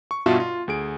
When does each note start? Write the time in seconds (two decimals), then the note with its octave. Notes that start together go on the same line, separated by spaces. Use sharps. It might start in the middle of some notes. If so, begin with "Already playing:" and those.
0.11 C#6
0.26 G2 B2 F4 F#4 E5 A5
0.40 F4
0.68 D2 G#4 D7